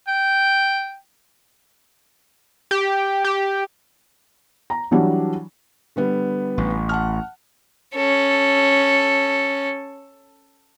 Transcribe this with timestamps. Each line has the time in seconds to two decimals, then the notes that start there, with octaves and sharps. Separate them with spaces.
0.08 G5
2.71 G4
3.24 G4
4.70 A#5
4.91 E3 F#3 G3 D4
5.96 D3 G3 B3
6.58 A1
6.89 F#5 A5 F6
7.96 C#4 A4